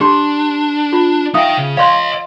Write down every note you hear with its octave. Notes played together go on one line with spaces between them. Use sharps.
D4 G4 C6
F4
D#4 E5 F5 G5 D#6
C#3
C#5 D#5 F5 C6